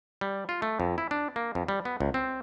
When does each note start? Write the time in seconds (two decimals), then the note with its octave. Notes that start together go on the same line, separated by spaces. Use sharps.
0.21 G3
0.49 F4
0.62 A3
0.80 F2
0.98 E4
1.11 D4
1.36 A#3
1.55 F2
1.68 G3
1.85 B3
2.00 C#2
2.14 C4